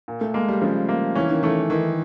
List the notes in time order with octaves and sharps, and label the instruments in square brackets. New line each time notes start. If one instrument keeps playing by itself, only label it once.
[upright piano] A#2
[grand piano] A3
[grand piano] G#3 [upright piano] A#3
[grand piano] G3
[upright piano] C#3 [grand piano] F3
[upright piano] A#3
[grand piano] E3 [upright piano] C#4
[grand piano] D#3
[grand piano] E3 [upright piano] A3
[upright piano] D#3 [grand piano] E3